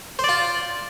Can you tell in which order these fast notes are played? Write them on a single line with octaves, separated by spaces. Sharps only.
C5 D5 F4